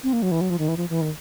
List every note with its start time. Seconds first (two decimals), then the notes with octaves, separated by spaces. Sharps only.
0.03 C4
0.13 A#3
0.22 F#3
0.31 E3
0.41 F#3
0.50 F3
0.59 D#3
0.68 E3
0.77 F3
0.90 E3
1.01 D#3